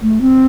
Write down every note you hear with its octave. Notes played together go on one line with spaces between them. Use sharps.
A3
C4